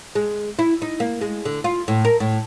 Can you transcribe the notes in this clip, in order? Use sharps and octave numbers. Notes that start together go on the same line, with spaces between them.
G#3
E4
D#4
A#3
G#3
D3
F4
A2
A#4
A2